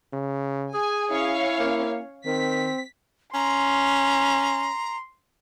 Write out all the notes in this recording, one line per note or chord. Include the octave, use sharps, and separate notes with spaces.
C#3
G#4 G#5
C#4 E4 C#5 F5
A#3
D#3 C4 B6
C#4 A#5 C6